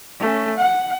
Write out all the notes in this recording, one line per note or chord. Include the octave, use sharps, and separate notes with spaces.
A3 C#4
F#5